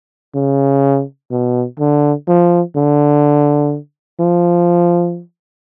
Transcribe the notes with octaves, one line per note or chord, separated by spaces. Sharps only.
C#3
B2
D3
F3
D3
F3